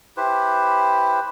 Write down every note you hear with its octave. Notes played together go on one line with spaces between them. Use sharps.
E4 G4 B4 C5